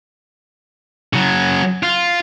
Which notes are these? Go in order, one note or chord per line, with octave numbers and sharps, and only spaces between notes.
C#3 F#3
F4